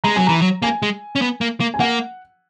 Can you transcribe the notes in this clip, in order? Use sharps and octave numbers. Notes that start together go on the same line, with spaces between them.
G#3 A#5
F#3 G#5
E3 A#5
F#3
A#3 G#5
G#3
C#4
B3
A#3
A#3
G#5
A#3 F#5